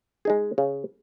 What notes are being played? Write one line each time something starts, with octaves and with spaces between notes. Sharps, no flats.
G#3 D#4 G#4
C#3